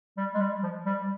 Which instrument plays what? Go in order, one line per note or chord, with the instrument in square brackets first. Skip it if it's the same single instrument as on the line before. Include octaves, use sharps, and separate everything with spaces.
[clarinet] G3
G#3
G3
F3
G3